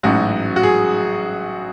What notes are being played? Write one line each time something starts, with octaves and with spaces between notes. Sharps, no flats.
A1 G#2 F#3 C#4 F#4
F#4
G#4